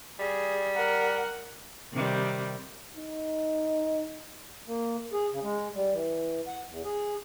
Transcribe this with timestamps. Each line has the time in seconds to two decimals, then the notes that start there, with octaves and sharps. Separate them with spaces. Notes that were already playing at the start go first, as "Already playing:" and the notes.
0.19 G3 G#4
0.75 A#4 F#5
1.92 C3 D#3 G3
2.97 D#4
4.68 A#3
5.13 G#4
5.31 C#3
5.43 G#3
5.75 G3
5.94 E3
6.47 F#5
6.69 E2
6.84 G#4